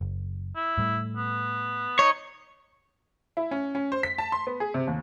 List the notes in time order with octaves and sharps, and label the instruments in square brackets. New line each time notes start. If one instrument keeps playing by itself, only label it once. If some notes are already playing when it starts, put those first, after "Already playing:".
[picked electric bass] F#1
[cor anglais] E4
[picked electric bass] A2 G3 A3
[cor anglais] B3
[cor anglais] D#4 [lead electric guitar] C#5
[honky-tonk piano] E4
C#4
C#4
C5
B6
A5
C6
B3
G#4
C3
D#2